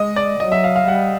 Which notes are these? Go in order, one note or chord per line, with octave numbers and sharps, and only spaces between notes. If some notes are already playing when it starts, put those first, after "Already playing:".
Already playing: G#3 D#5
D5
F#3 D#5
E5
F5
F5
G3 F#5